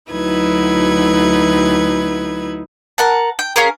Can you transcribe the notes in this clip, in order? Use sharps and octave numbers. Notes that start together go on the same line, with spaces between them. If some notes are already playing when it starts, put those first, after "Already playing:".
D2 F#3 D#4 E4 B4 G#6
A#4 F#5 A5
G5
C#4 F4 G#4 A#4